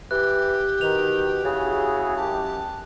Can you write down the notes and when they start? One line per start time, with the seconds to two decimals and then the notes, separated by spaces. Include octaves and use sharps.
0.11 E3 G4 F#6
0.81 B2 D#3 F7
1.45 C#3 E4 F#4 G#4
2.17 F#2 G4 A5